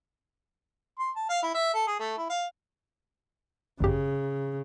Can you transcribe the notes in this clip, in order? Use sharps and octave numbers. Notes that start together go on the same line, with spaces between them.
C6
A5
F5
E4
E5
A4
G#4
A3
E4
F5
G#1 F#2 C#3 G4